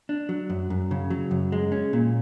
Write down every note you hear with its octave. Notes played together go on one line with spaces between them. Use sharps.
D4
F#3
F#2
F#2
C#3
F#3
F#2
G#3
C#4
A#2